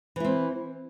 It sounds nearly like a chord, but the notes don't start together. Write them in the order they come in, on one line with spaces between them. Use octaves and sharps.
E3 E4 C4